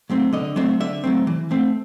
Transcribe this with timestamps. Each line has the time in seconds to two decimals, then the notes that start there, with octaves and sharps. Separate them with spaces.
0.10 F#3 A3 C4
0.33 D3 D#5
0.56 F#3 A3 C4 E5
0.80 D3 E5
1.04 F#3 A3 C4
1.27 E3
1.51 A3 C4